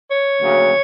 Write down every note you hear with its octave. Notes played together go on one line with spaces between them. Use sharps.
C#5
D2 C#3 F#3 A#3